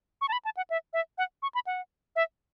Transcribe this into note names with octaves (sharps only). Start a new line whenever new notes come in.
C#6
A5
B5
A5
F#5
E5
E5
F#5
C#6
B5
F#5
E5